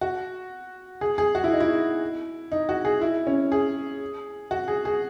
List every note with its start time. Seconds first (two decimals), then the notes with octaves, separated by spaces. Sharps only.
0.01 F#4
1.01 G#4
1.18 G#4
1.35 F#4
1.44 E4
1.53 D#4
1.60 E4
2.52 D#4
2.69 F#4
2.85 G#4
3.01 E4
3.27 C#4
3.52 G#4
4.51 F#4
4.68 G#4
4.85 G#4